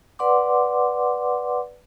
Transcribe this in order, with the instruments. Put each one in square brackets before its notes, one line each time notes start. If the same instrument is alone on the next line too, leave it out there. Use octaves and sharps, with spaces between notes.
[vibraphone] B4 D5 F#5 C6 D6